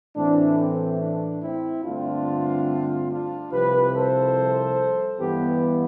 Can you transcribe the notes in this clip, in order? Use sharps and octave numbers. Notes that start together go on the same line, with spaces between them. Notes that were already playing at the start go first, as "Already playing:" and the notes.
A2 E3 A3 C4 D4
C4
D4
C4 E4
G2 D3 A3 C4 D4 F4
D4 F4
C2 C3 F3 G4 B4
A4 C5
G2 E3 B3 G4 B4